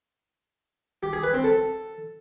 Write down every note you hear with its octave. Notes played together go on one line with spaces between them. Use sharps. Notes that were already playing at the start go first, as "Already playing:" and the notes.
G4
G#4
B4
C4
A4